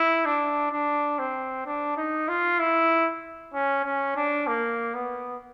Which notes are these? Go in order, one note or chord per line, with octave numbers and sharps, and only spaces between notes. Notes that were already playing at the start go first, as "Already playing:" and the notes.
Already playing: E4
D4
D4
C4
D4
D#4
F4
E4
C#4
C#4
D4
A#3
B3